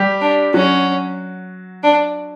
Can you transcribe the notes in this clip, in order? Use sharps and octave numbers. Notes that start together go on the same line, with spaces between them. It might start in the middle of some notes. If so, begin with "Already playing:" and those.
Already playing: G3 G4
D4
F#3 C#4 F#4
D4